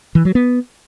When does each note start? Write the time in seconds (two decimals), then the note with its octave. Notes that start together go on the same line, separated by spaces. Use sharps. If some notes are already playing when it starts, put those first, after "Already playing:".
0.15 E3
0.25 F#3
0.35 B3